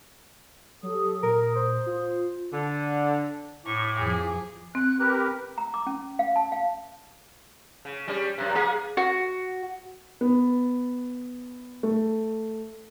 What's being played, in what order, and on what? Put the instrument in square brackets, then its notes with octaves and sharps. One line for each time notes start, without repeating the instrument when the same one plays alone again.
[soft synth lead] F#3 [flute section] G4 A4 D#6
[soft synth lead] A#2 [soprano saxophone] A#4 [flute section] D#6
[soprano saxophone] C5
[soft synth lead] F4
[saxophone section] D3
[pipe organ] A2 [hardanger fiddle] C#6 [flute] D6
[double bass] F2 F3 [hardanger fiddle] G#4
[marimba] C4 [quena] F#6
[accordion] G4 A#4 B4
[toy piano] A#5
D6
C#4
F5
A5
F5
[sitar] C#3
G3 C#4
F#2 C3
A#3 G#4
[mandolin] F#4
[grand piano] B3
A3